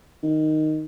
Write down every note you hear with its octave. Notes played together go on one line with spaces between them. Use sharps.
D#3